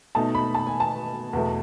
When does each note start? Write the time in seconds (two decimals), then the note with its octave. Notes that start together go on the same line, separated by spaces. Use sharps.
0.15 B2 A3 D#4 A5
0.35 B5
0.54 A5
0.67 G#5
0.80 A5
1.33 E2 B2 A3